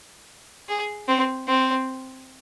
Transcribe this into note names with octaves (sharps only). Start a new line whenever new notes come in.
G#4
C4
C4